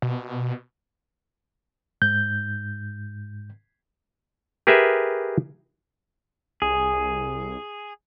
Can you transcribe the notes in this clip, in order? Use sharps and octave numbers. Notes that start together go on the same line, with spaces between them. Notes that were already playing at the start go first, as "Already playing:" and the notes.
B2
G#2 G6
G4 G#4 A#4 B4 E5
C2 G#4